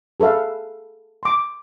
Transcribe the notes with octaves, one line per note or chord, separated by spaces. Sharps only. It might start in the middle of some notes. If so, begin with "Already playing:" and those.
G#4 A4 B4 E5 F5
C6 D6